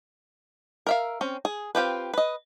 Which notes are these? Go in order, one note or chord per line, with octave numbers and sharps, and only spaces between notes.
A#4 E5 F5
C4 C#4
G#4
C4 F4 G4 B4
B4 D#5